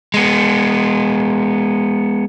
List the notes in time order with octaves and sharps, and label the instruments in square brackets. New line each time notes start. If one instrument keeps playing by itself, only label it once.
[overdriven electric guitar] G#3 B3